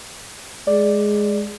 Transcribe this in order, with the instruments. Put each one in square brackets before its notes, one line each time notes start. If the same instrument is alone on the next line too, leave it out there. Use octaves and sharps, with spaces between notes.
[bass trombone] G#3 [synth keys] D5